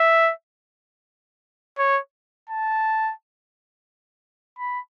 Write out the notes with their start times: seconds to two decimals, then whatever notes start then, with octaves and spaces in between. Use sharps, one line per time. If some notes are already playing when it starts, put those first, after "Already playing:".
Already playing: E5
1.79 C#5
2.50 A5
4.59 B5